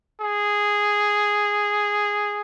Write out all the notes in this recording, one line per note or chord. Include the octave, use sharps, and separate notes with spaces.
G#4